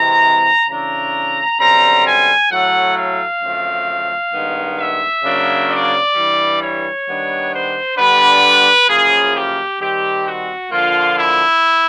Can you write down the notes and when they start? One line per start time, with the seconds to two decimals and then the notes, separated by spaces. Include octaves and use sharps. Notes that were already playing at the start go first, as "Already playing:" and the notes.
Already playing: C3 E3 G#3 C4 A#5
0.69 C#3 E3 A3 D4 A#5
1.59 F#2 D3 G3 C4 A#5
2.05 G#5
2.51 A2 F#3 A3 F#5
2.97 F5
3.42 F#2 D3 F3 A3 C4
4.33 G2 D#3 G#3 B3
4.78 E5
5.24 C#3 F#3 A#3 D4
5.70 D5
6.15 G2 E3 G3
6.60 C#5
7.06 D#3 G3 B3 D4
7.52 C5
7.97 D3 G3 B3 D4 B4
8.89 F#2 C#3 F3 A#3 G#4
9.34 G4
9.80 D#3 G3 C4 G4
10.25 F#4
10.70 D3 F3 A#3 F4
11.16 E4